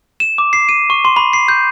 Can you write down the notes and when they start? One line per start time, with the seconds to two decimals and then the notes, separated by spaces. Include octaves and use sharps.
0.20 E7
0.38 D6
0.53 C7
0.69 D#7
0.90 C#6
1.05 C6
1.16 B5
1.33 C7
1.48 G6